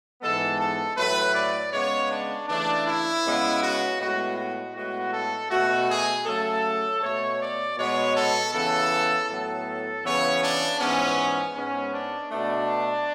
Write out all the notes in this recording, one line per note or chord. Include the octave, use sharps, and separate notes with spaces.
G#2 E3 G#3 B3 A4
A4
A2 F#3 A3 B4
D5
C#3 G#3 B3 C#5
D4
C#3 E3 A3 D4
E4
C#3 G#3 B3
F#4
A2 G#3 B3 F#4
F#4
A2 G#3 B3 F#4
A4
B2 A3 F#4
G#4
C#3 F#3 A3 A4
B2 A3 C#5
D5
B2 G#3 B3 C#5
A4
C#3 E3 B3 A4
A2 F#3 B3 A4
C#3 E3 B3 C#5
D4
G#2 E3 B3 C#4
G#2 G#3 B3 C#4
D4
B2 A3 D4